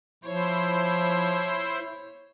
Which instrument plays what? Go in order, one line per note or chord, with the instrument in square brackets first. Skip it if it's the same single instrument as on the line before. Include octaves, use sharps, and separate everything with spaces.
[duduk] F3 [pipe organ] E4 C5 [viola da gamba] C#5